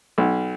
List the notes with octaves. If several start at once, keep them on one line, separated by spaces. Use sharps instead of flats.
B1